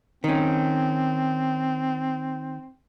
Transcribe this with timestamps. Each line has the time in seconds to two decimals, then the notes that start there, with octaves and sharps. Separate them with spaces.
0.24 D#3 C4 C#4